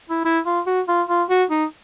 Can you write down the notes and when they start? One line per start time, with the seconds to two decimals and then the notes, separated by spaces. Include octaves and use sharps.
0.10 E4
0.25 E4
0.46 F4
0.66 F#4
0.88 F4
1.08 F4
1.29 F#4
1.50 D#4